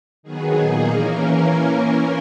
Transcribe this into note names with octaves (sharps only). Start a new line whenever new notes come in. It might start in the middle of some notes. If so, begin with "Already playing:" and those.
D#3 F#3 B3 G#4
A#2 A#3 D#4
E3 A#3 C#4 A#4